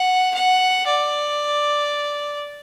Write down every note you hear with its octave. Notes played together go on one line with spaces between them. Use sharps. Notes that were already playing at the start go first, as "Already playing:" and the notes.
Already playing: F#5
F#5
D5